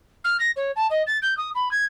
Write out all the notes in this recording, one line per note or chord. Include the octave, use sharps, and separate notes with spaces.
F6
A#6
C#5
A5
D#5
A6
G6
D#6
B5
G#6